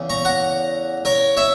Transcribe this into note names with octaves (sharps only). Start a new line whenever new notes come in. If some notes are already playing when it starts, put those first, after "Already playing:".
Already playing: E2 C#3
A#5 C#6
F#5 A#5
A#4 C#5
C#5 E5